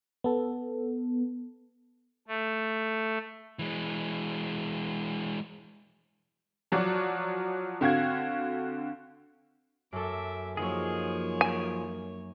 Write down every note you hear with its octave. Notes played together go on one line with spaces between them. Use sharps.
B3 A4
A3
E3 G#3
F3 F#3 F#4 D5
D3 C4 F#4 F5 G#6
F#2 A4 E5 D6
F3 F#3 A#3 D#4 G#4 C#5
G#5 D7 E7